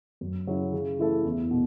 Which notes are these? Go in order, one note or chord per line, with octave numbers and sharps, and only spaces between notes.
F#2
C#3 F#3 C#4 E4
C#3
E3 A3 E4 A4
E2
B2